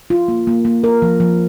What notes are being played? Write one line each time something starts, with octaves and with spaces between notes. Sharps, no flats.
F4
A#3
A#3
A#3
A#4
F3
F3